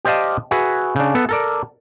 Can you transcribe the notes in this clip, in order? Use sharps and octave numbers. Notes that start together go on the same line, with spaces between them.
G4 C5 D5 D#5 F5 A5
F#4 G#4 B4 E5
C#3 D4
B3 A4
A4 A#4 D5